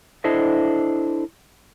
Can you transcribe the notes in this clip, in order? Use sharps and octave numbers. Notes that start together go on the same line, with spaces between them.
D4 E4 A4 C5 D#5 E5